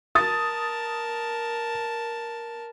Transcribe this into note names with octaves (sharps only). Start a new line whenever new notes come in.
A#4 A5 D#6 A6